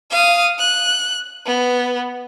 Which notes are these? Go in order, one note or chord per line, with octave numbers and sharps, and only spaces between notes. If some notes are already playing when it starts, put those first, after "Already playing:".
F5 D#6
F#6
B3